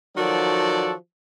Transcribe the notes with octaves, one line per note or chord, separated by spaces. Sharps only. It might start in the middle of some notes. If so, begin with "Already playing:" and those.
D#3 F3 F#3 F#4 A4 D5